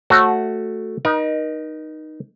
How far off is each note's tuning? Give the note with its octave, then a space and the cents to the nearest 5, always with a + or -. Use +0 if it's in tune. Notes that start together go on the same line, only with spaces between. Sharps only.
A3 +0 F#4 +0 C#5 -25
D#4 -10 A#4 +40